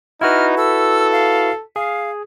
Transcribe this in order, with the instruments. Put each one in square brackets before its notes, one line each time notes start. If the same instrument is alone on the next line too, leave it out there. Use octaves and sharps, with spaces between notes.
[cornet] D#4 [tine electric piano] E4 F#4 B4 [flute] F6
[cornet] A4 [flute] E6
[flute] F5
[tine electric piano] G#4 [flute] F5